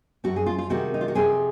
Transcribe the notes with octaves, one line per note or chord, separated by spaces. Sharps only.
F#2 F3 C4 F#4
G#4
F4
F4
C3 D#3 G#3 C4 F#4
D#4
F4
F#4
F2 C3 F3 C4 G#4